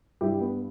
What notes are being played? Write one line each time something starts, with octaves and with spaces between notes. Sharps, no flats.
G2 E4 G4
B3